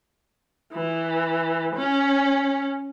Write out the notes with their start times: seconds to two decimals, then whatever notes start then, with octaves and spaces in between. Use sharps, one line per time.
0.73 E3
1.76 C#4